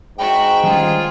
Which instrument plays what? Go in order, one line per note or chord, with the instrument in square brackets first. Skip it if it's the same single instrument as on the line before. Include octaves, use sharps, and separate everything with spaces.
[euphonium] G#2 [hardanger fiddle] F#4 E5 [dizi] G5
[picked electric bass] D#3 G3 C#4 [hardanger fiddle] F4 G#4